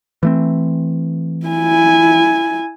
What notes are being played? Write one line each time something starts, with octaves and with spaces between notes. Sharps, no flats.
E3 A3 C4
E4 G#5